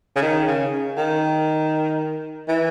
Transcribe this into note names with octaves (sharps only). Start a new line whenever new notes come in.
C#3
D#3
C#3
D#3
E3